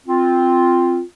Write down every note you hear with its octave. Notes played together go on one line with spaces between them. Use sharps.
C4 F4